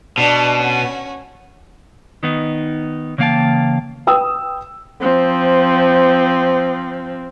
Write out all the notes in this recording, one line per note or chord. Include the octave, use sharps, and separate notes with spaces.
B2 D4 A5
C#4 F#4
D#3 B3 D#4
C#3 E3 A#3 F5 G5 A5
B4 G5 D#6 E6
F3 C4